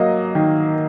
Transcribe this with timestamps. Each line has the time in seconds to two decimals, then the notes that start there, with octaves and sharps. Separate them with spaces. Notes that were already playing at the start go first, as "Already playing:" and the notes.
Already playing: F#3 A#3 D#5
0.35 D#3